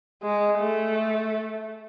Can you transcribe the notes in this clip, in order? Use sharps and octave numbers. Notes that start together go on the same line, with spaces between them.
G#3
A3